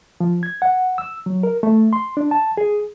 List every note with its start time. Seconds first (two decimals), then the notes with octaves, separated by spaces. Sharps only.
0.20 F3
0.43 G#6
0.62 F#5
0.98 E6
1.26 F#3
1.43 A#4
1.63 A3
1.93 C6
2.17 D4
2.31 A5
2.57 G#4